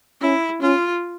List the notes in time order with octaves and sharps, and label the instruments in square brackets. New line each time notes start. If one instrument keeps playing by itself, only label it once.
[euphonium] C#4 [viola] E4
[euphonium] C#4 [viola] F4